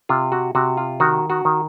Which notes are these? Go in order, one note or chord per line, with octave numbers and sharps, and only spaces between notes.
C3 F4
F#4
C3 F#4
F4
D#3 F#4
F#4
D#3